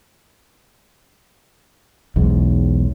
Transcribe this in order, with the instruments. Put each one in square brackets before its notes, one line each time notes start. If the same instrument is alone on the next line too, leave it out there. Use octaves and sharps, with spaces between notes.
[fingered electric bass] B1 E2 G#2